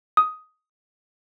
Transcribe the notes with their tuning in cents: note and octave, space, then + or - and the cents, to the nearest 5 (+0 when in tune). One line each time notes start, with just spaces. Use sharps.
D#6 +10